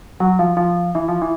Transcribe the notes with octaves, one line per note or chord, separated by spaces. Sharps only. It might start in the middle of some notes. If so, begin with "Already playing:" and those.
F#3
F3
F3
E3
F3
E3